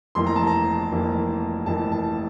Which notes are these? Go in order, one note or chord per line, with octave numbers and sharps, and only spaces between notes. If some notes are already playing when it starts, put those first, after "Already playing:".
F1 F2 E3 A#3 C6
A#5
A5
A#5
F1 F2 E3 A#3
F1 F2 E3 A#3 A5
A5